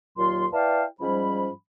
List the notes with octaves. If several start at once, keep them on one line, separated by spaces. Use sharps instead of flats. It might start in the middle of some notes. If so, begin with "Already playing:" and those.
D#2 A#2 F#3 F4 C6
E4 B4 D5 F5 G5 A5
G#2 F3 G3 C#4 B5